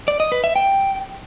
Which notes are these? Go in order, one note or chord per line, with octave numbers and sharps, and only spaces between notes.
D5
D#5
B4
E5
G5